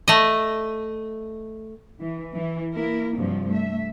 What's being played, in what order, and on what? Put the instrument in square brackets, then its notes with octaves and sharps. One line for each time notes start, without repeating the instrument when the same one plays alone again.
[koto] A3 D#5
[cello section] E3
E3
A#3 E4 A#4
G2 C3 F3 F#3
A3 E5